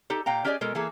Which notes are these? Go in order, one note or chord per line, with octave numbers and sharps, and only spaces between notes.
D#4 G4 A4
A#2 F5 G5 A#5
C#4 G4 G#4 D5 D#5 G#5
B2 G#3 A4 A#4
E3 A#3 G#4 A4